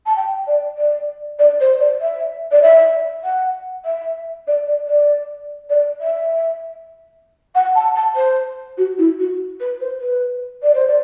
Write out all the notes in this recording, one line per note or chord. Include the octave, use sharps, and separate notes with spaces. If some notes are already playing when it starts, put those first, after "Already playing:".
A5
G5
D5
D5
D5
C5
D5
E5
D5
E5
F#5
E5
D5
D5
D5
D5
E5
F#5
A5
A5
C5
F#4
E4
F#4
B4
C5
B4
D5
C5
D5